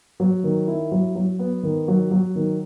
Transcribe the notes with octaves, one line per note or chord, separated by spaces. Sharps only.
F#3
D#3
E4
F#3
F#3
B3
D#3
F#3
F#3
D#3